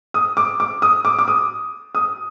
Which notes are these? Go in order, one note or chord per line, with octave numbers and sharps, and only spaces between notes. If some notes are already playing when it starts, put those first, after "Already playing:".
D#6
D6
D6
D#6
D6
D6
D#6
D#6